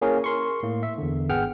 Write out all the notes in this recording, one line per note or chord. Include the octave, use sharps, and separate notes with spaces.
A#3 C#4 E4 G#4 A#4 C#5
A#4 C6 C#6
A2 A#3
E5
E2 D3
G#1 B3 G#4 F#5 G5 F6